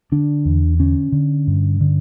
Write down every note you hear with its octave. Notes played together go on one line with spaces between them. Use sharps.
D3 D4
E2
D3 C#4
D3
G2
D3